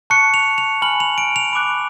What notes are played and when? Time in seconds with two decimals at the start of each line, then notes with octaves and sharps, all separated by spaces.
0.10 A5 C#6 F#6 C#7
0.34 F7
0.58 F7
0.82 G#5 B5 F6 F#7
1.00 F7
1.18 D7
1.36 F7
1.53 B5 D6 F#6